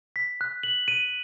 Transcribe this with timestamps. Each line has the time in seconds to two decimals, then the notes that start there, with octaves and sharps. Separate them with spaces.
0.16 B6
0.41 F#6
0.63 F#7
0.88 D#7